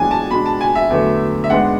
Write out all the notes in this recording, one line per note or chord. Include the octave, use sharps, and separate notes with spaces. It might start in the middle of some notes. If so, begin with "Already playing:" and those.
Already playing: F#2 E3 G#3 B3 D4 G#5
A5
B2 G#3 D4 B5
A5
G#5
E5
E2 D3 F#3 A3
E5
G#2 G#3 B3 D4 F#5